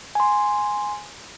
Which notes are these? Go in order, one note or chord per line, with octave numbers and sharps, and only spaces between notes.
G#5 C6